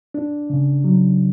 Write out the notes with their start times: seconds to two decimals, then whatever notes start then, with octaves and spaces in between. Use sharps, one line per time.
0.14 D4
0.50 C#3
0.84 F#3